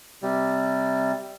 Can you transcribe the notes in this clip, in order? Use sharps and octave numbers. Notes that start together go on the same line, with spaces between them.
C3 G3